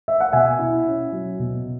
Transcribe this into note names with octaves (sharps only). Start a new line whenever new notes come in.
E5
F#5
B2 E5 G#5
E4
C#4
F#3
B2